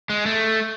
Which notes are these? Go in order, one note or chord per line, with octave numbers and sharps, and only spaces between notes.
G#3
A3